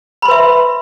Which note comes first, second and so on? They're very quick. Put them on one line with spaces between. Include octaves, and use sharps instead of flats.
B5 C6 B4 E5